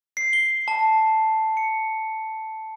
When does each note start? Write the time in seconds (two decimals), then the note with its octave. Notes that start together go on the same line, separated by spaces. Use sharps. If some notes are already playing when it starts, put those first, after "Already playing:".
0.17 C7
0.33 G7
0.68 A5
1.57 C#7